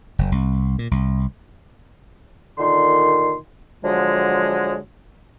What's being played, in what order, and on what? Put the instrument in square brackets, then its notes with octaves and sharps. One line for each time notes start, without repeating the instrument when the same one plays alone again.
[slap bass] F#1
C2
A#2
C2
[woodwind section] A#2 D3 D#3 C6
D3 F3 F#3 G#3